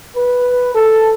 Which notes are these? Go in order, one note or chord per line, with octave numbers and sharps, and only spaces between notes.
B4
A4